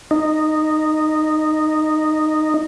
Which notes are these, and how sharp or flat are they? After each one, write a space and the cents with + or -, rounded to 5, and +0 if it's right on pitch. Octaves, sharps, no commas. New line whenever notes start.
D#4 -10